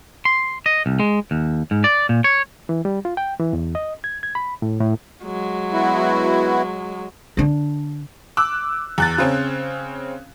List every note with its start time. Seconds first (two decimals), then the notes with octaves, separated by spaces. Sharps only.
0.25 C6
0.66 D#5
0.86 C2
1.00 G#3
1.31 D#2
1.71 G#2
1.84 D5
2.09 A#2
2.24 C#5
2.69 E3
2.85 G3
3.05 F4
3.17 G5
3.40 E3
3.53 E2
3.75 D#5
4.04 G#6
4.23 G#6
4.35 B5
4.62 A2
4.80 A2
5.24 F#3 G#3
5.73 B3 E4 F#4
7.37 D3 D4
8.37 D6 E6 F#6
8.98 E2 F#6 A6
9.18 C#3 C4 C#4